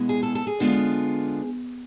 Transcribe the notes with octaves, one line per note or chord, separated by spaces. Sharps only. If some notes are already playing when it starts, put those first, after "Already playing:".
Already playing: B2 G#3 B3 E4
G#4
A4
A4
G#4
D3 G#3 B3 F4